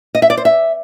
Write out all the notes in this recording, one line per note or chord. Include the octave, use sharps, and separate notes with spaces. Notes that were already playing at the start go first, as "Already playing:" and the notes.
D#5
E5
D5
C5
E5